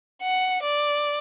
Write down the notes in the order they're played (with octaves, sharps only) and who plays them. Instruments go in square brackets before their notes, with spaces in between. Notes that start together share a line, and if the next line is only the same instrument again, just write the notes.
[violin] F#5
D5